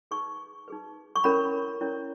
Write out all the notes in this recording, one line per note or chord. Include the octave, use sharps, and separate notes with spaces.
D#4 G#4 B4 C#6
D#4 G#4 B4
C#6
C#4 E4 A#4 C#5 B5
C#4 E4 A#4 C#5